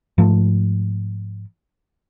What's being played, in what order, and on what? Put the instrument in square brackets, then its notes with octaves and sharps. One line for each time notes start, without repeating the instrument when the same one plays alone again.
[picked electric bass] G#2 F3 A3